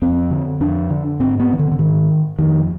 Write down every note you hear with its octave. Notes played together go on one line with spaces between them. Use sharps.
F2 C4
D3
F2 D4
D3
G#2 C4
B3
D#3
D3
D3
G#2 D#3
F2 D#3